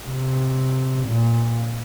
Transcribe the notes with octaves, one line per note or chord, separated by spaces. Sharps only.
C3
A#2